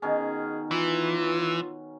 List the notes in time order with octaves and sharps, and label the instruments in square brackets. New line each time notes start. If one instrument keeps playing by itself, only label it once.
[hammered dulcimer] B2 D#3 C#4 [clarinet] G#4
[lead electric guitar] E3 [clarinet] F4